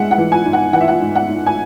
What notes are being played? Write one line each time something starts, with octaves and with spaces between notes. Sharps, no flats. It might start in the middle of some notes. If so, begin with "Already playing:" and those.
Already playing: G#2 G#3 E5 F#5
F#5
E3
G#5
G#2
F#5
E3 F#5
E5
F#5
G#2
F#5
G#2
G#5